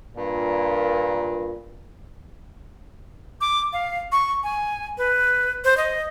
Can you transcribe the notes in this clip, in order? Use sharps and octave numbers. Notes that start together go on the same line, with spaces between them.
G2 A#2
D6
F5
C#6
G#5
B4
C5
D#5